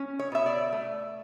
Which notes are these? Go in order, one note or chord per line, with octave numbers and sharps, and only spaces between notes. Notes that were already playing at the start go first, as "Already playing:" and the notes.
Already playing: C#4
C#5
B2 E5
D5
A3